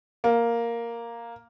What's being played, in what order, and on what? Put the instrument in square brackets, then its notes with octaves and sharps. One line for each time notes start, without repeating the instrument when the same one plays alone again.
[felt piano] A#3